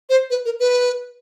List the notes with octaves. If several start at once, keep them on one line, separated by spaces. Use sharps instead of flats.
C5
B4
A#4
B4